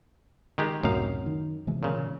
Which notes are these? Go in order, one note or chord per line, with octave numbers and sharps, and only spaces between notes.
D#3 G#3 G4
C#2 F#2 A2 C3 D#4 F5
D#3
C3 E3 G#3
A#2 C#3